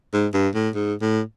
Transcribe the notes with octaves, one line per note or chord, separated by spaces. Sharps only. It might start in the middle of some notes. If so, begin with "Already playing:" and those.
G#2
G2
A2
G#2
A2